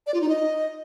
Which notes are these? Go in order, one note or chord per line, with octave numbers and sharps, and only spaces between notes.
D5
F4
D#4
D#5